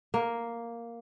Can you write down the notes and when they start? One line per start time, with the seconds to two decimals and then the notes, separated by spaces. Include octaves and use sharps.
0.14 A#3